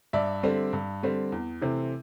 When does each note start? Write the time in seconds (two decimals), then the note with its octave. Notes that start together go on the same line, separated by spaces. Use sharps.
0.13 G2 D5 E5
0.43 D3 G3 C4
0.73 G2
1.03 D3 G3 C4
1.32 E2
1.62 C3 E3 A3 C4